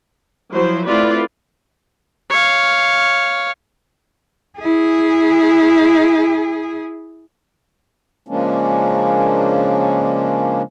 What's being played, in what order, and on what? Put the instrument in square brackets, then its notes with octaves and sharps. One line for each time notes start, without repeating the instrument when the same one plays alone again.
[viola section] F3 F#3 E4 C5
A3 C4 E4 F4 B4 D5
[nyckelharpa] C#5 F5
[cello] E4 G#4
[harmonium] C#3 F3 G#3 A#3 C#4 D4